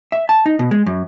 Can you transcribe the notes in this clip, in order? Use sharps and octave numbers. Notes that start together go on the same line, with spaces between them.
E5
A5
D#4
B2
G#3
F#2